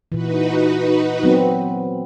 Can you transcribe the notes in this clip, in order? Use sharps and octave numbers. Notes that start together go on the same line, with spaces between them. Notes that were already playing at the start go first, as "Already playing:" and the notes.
A#2 E3 D#4 F#4 B4
F#3 B3 C4